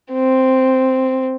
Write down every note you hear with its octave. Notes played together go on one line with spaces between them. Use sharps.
C4